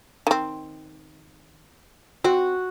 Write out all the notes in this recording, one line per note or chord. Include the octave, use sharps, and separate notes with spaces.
D#3 C4
C4 F#4